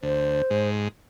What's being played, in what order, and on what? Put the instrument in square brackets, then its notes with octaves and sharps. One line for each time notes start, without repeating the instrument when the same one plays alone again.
[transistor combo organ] D2 [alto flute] C5
[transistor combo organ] G#2